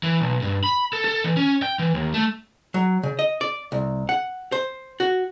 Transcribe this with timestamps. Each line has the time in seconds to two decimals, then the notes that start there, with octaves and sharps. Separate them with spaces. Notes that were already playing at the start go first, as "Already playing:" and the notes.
0.03 E3
0.21 B1
0.42 G2
0.64 B5
0.93 A4
1.04 A4
1.24 E3
1.37 C#4
1.62 G5
1.79 E3
1.94 D#2
2.14 A3
2.74 F#3
3.03 C#3
3.19 D#5
3.41 D5
3.72 C2
4.09 F#5
4.52 C5
5.00 F#4